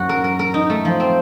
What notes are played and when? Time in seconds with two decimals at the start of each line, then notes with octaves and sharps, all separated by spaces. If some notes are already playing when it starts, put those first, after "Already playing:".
Already playing: F#2 F#3 F#4
0.09 A#4
0.24 A#4
0.39 A#4
0.54 D#4
0.70 A3
0.85 F3
1.00 C4